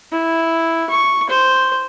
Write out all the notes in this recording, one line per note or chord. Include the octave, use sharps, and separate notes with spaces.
E4
C#6
C5